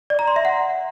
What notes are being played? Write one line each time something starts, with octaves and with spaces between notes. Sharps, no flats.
D5
A#5
C6
E5
F#5